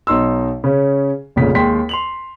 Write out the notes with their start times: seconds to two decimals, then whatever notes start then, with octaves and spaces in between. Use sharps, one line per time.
0.07 B1 D#4 C6 E6
0.64 C#3 C#4
1.36 F1 A#1 A#2 C#3 B6
1.55 D#2 G#3 G5 C6 B6
1.89 C6 F7 F#7